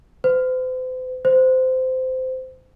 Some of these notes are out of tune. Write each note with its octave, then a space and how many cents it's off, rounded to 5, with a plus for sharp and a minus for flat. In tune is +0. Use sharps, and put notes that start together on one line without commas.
C5 -40
C5 -20